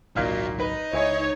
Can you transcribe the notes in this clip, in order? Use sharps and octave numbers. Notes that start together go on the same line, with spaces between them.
G#1 C#2 A#2 F#3 D#4 F#4 F5 F6
D#4 B4
C#2 E4 G#4 C#5 D#5